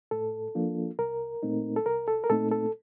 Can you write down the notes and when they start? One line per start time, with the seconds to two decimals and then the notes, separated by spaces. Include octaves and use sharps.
0.11 A2 A4
0.55 F3 A#3 D4 F4
0.99 C2 A#4
1.43 A#2 A3 C4 D#4
1.76 A4
1.86 C2 A#4
2.08 A4
2.24 A#4
2.30 A#2 A3 C4 D#4 A4
2.52 A4